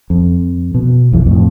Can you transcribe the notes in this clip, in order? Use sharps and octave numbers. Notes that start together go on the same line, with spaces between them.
F2
B2
B1 F2 E3
F2 A2